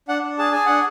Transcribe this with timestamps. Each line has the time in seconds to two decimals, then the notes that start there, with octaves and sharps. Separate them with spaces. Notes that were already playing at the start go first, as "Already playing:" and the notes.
0.08 D4 F#5
0.23 D4
0.38 G#4 A5
0.52 G#4 G#5
0.66 D4 F#5